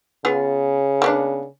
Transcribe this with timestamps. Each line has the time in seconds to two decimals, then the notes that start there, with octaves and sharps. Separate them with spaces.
0.25 C#3 B3 F4 G#4
1.02 A#3 B3 D4